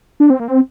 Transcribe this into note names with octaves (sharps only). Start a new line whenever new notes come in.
D4
C4
A#3
C4